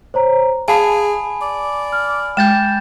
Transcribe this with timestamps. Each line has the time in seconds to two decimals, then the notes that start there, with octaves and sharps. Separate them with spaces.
0.14 C5 C#5 A#5
0.68 G#4 F5 G#5 A5 B5
1.41 D5
1.92 F6
2.37 G#3 G5 G6 A6 E7